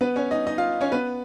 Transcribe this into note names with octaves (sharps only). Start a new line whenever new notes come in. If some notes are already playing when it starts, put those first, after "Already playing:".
B3 B4
C#4 C#5
D#4 D#5
D#4 D#5
F4 F5
C#4 C#5
B3 B4